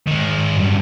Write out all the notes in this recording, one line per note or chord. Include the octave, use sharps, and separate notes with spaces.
D#3 G#3
G2 F#3